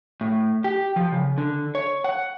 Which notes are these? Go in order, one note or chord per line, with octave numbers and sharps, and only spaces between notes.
A2
G4
F3
C#3
D3
C#5
F#5